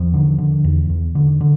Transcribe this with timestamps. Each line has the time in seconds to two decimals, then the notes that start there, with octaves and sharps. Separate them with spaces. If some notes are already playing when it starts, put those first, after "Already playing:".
Already playing: E2 F3
0.14 D3
0.38 D3
0.64 E2
0.90 E2
1.15 D3
1.41 D3